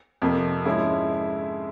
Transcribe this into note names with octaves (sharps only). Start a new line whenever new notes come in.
F2 C3 F3 A#3
G#2 F3 G#3 C#4 E4